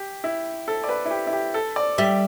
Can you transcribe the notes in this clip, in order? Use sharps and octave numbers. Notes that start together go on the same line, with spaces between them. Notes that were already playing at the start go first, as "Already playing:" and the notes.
Already playing: G4
E4
A4
D5
B4
E4
G4
E4
G4
A4
D5
G3 E5